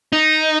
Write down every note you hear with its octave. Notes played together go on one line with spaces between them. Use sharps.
D#4